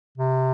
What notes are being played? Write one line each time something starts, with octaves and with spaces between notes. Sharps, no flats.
C3